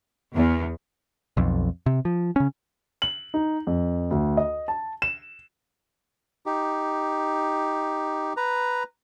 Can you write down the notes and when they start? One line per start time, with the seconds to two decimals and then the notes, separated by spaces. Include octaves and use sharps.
0.34 E2
1.37 B1 F2
1.86 C3
2.05 F3
2.36 C#3 C#4
3.02 F#7
3.34 D#4
3.67 F2
4.11 D2
4.37 D#5
4.68 A5
5.02 E7
6.46 D#4 G4
8.37 B4 A#5